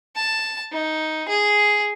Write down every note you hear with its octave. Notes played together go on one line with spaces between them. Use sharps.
A5
D#4
G#4